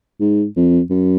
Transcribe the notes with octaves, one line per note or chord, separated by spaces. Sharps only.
G#2
F2
F#2